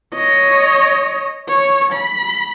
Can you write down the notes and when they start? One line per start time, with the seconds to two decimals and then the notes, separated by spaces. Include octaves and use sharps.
0.15 C#5 D#5
1.49 C#5
1.94 B5